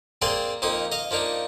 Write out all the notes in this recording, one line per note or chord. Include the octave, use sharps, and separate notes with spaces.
A#3 C4 G#4 D5 G#5 C6
F2 F3 A#3 D#4 D#6
D#5 F5
F3 A#3 D4 D#4